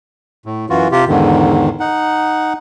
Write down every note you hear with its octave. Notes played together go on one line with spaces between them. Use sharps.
A2
F#2 E3 F4 F#4
C3 F4 G4
E2 G#2 D3 D#3
D#4 F#5